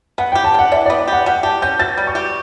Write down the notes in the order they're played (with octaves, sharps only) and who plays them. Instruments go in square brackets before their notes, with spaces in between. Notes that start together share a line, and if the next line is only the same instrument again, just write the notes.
[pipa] B3 [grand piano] F#5
[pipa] G4 [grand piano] G5
[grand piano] A5
[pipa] D4 [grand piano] F#5
[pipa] E3 [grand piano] D5
[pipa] B3 [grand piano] D5
[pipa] G4 [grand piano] F#5
[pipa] G3 [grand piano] F#5
[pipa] G4 [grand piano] A5
[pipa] C#4 [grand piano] G6
[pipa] B2 [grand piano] A6
[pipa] G3
[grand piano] C#6
[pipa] G4